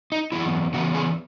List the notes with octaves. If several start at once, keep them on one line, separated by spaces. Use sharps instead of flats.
D#4
F#2 E3 B3 E4
C#3 E3 B3 F#4
G#4